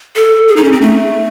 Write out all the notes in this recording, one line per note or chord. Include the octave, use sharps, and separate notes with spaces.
A4
G#4
D#4
C#4
C4
A3